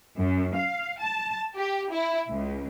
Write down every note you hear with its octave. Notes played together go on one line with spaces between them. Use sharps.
F#2
F5
A5
G4
E4
C#2